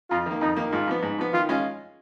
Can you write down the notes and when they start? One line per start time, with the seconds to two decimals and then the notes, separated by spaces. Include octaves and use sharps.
0.11 F2 F4
0.26 D#3 A#3
0.41 F2 D#4
0.56 D#3 A#3
0.72 G#2 F4
0.87 F3 B3
1.02 G#2
1.18 F3 B3
1.33 D#3 F4
1.49 G#3 C#4 F4